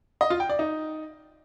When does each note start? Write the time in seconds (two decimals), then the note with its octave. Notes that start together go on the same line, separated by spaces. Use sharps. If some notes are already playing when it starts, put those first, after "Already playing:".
0.21 D#5
0.30 F4
0.40 G5
0.49 D5
0.59 D#4